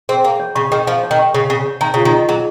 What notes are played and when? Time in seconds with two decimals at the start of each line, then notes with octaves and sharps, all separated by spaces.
0.09 C4 G#4
0.24 A#3 F#5
0.40 C#5
0.55 C#3 C#6
0.71 D#3 G#4
0.87 F3 F#5
1.04 C#5
1.11 D#3
1.19 C#6
1.34 C#3 G#4
1.50 C#3 F#5
1.65 C#5
1.81 D#3 A#5
1.94 C#3 F4
2.05 D#3
2.13 D#5
2.29 F#3 G#4